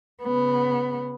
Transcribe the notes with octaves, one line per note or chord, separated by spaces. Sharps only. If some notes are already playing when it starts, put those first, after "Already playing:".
C#3 B3